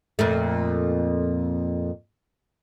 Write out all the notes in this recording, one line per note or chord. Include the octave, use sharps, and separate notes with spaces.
F2 A#2 A3